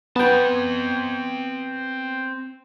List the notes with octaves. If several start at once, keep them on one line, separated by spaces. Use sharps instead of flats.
B3 C4 G5 A5